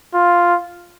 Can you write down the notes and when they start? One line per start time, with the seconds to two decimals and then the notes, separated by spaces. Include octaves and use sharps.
0.14 F4